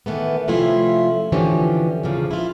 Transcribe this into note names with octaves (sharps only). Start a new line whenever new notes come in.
D#3 E3 A3 B3
C3 F3 A3 C#4 E4 F4
D3 E3 F3 C#4 G4
E2 G2 C#3 F3
E4 F4